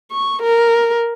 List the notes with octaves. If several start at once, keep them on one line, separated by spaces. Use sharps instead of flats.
C#6
A#4